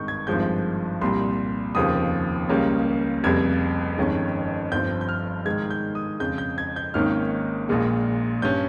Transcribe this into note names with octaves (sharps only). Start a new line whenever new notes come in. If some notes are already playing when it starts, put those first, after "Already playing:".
Already playing: G#1 G2 D#3 G#3 C#6 G6
G#6
G#1 G2 F3 G#3 G6
C2 A#2 G3 C6
F1 D#2 C#3 F3 D#6
C#2 C#3 G3 A#3 C#4
F1 F2 C#3 G3 G#6
G1 F2 D#3 G#3 C#4
G1 G2 F3 C4 G6
G6
F6
G#2 D#3 G#3 G#6
G6
D#6
F2 C#3 G#3 G6
G6
G#6
G6
G#1 G#2 D#3 A#3 C#4 F6
A#1 A#2 G#3
G2 G3 C#4 G6